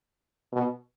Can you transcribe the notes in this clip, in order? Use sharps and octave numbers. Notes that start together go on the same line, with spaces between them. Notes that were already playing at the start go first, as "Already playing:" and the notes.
B2